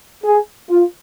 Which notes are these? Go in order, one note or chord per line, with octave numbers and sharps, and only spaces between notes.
G#4
F4